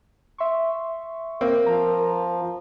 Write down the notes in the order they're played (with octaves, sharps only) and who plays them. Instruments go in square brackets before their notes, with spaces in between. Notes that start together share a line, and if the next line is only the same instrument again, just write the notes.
[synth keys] E5 C6 C#6
[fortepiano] A#3 C4 [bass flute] A#4
[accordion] F3 [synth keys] A#5